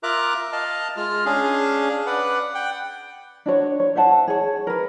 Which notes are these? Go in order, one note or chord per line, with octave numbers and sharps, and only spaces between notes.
F4 A#4 E5 A#5 D6 F#6
D#5 F5 A5 F6
G#3 F4 F6
C#4 D4 G#4 F5
B4 D5 F#5
F#5 G5
D4 F#4 C#5
C#5
C5 E5 F#5 A5
G#4 C#5
A#4 B4